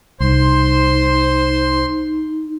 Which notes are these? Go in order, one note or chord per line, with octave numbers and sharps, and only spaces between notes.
C2 D#4 C5 C6